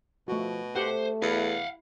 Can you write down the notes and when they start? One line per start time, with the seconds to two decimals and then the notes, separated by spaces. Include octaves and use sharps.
0.28 B2 F3 A3 F#4
0.76 A3 G4 C5 F#5
1.22 E2 E4 F5 F#5